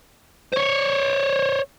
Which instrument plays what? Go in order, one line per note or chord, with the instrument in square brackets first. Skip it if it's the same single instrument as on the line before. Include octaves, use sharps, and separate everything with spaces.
[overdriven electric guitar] C5 C#5